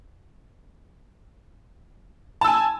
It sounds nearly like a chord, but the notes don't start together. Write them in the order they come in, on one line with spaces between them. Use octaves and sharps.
A5 E6 G#5